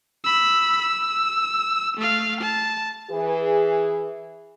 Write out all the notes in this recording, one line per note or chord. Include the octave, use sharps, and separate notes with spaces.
B5 E6
E6
A3 F5
A5
E3 G#4